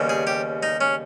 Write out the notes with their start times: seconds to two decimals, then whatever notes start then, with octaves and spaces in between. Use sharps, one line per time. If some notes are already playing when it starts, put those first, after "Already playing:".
Already playing: D#2 C#3 G3 B3
0.09 G#4
0.27 G4
0.63 D#4
0.81 C#4